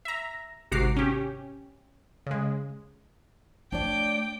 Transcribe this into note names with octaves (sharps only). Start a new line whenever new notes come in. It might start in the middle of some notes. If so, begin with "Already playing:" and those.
E5 A#5
G#1 C3 F#4 A#5 D6 C7
C#4 G4
C#3 G#3
A3 D4 C#5 D5 G5 D6